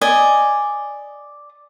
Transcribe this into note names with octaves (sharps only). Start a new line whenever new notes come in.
D5 D#5 G#5